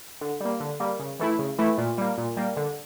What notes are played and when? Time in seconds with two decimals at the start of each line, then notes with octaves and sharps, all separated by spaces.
0.21 D3
0.40 G3 A#3
0.60 D3
0.80 G3 A#3
0.99 C#3
1.19 E3 A3 E4
1.39 C#3
1.58 E3 A3 E4
1.78 A#2
1.98 G3 A#3
2.18 A#2
2.37 G3 A#3
2.57 D3